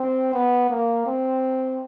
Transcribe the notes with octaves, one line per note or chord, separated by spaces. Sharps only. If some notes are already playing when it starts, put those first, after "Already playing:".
Already playing: C4
B3
A#3
C4